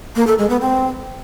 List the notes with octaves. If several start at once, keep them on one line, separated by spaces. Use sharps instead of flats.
A#3
A4
G#3
B3
C4